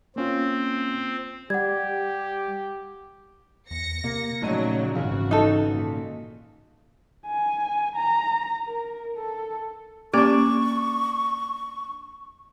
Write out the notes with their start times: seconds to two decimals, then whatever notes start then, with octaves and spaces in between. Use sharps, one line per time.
0.16 A#3 C4 C#4 F4
1.50 G3 G4 F#5 G#6
3.71 E2 A#6 C#7
4.04 C3 A#3
4.42 A#1 A#2 C#3 F#3 A3 D#4 D#7
4.95 G#1 C#3 E3 F#4
5.31 D#4 A4
5.72 A#2
7.26 G#5
7.96 A#5
8.66 A#4
9.16 A4
10.13 A#3 C#4 D4 G4 D5 C#6